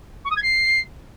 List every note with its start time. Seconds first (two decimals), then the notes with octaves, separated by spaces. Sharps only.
0.24 C#6
0.30 D#6
0.36 G#6
0.42 C7